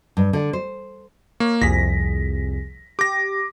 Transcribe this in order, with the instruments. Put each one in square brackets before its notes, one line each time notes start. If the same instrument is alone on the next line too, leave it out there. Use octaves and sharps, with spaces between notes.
[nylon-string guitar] G2
D3
C5
[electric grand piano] A#3 [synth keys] C#5
[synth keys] C2 F2 G#4 [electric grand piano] A#6 B6
[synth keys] G4 [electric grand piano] D6 A#6